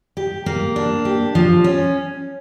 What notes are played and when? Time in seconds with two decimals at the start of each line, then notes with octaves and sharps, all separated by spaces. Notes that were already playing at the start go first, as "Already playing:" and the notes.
0.17 G4
0.46 A#3
0.76 D4
1.05 G4
1.35 F3
1.64 C#4